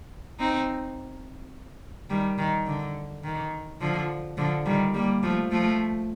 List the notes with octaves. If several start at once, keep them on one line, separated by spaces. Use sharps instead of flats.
C4 D#4
D#3 G3
D#3
D3
D#3
D3 F3
D3 F3
D#3 G3
G3 A#3
F3 A3
F3 A3